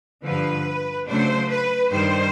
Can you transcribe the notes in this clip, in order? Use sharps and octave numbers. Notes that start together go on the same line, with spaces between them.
G2 D3 F3 B4
C#3 F#3 A3 D4 C5
B4
G2 D#3 G3 C5